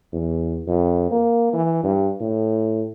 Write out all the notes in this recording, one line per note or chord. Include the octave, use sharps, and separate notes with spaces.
E2
F2
A#3
E3
G2
A2